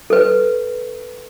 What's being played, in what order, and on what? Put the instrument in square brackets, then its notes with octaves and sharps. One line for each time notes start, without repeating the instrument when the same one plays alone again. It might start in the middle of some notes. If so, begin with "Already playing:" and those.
[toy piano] A4 B4